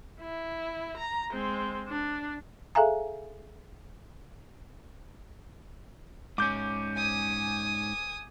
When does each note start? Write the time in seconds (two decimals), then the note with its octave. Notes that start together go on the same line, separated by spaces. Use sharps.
0.21 E4
0.97 A#5
1.32 G#3 C4
1.89 D4
2.75 G#4 A4 E5 F5 G#5 A#5
6.38 G#2 C#4 D6 G6
6.97 G#5 D#6